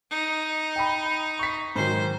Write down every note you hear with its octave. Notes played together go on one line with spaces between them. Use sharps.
D#4
G5 B5
C#6 B6
G#2 D#3 F#3 C5